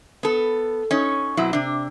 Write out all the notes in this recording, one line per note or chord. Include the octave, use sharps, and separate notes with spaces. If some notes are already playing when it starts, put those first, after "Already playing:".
B3 A4
C#4 D#4 C#5
B2 F#3 C4 E4
C3 D4